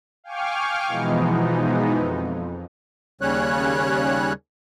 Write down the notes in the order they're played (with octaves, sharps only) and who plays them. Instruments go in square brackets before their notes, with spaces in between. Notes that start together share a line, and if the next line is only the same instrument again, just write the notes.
[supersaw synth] F5 G5 G#5 C#6 D6 F6
B2 E3 F3 G#3 B3 D#4
F2
[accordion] D#2 C#3 G3 C#4 C#5 F#6